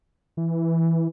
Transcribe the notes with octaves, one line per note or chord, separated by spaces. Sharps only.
E3